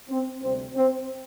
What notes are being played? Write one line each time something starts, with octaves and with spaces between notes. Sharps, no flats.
C4
D2 C3 G3 C4
C4